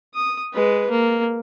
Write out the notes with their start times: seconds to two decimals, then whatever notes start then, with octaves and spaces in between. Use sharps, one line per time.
0.15 D#6
0.53 G#3 B4
0.90 A#3